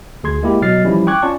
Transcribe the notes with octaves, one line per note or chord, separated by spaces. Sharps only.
D2 G#4 C6 G#6
G#3 A#3 E4 G4
B2 F#3 D#5 F6 A6 C7
E3 F3 G3 C#4 E4
G5 C#6 D6 F#6 G#6
C#4 F4 D5 A5 C#6